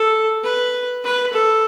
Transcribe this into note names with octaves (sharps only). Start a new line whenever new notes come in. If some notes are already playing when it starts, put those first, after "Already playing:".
Already playing: A4
B4
B4
A4